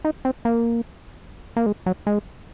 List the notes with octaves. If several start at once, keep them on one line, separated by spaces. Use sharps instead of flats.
D#4
C4
A#3
A#3
G#3
F#3
G#3